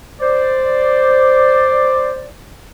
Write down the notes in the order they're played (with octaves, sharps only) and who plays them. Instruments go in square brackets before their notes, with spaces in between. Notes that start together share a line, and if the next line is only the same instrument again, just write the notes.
[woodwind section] C5 D5